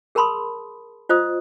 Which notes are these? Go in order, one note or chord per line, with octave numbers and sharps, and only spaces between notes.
G#4 A#4 A5 B5 C6 D#6
F4 C5 D#5 D#6